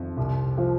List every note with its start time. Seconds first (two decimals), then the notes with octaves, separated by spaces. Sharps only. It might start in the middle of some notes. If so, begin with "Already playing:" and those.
Already playing: F2 D#3
0.17 C2
0.58 F3